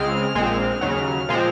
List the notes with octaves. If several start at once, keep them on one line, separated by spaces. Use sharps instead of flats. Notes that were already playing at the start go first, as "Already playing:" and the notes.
Already playing: C#2 C#3 G#3 C4 F6
A#1 A#2 G#3 C4
D#2 C#3 F#3
A#2 F3 G#3 C4